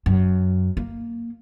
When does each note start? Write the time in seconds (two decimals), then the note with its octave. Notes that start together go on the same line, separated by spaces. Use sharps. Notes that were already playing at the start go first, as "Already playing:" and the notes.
0.06 F#2
0.77 A#3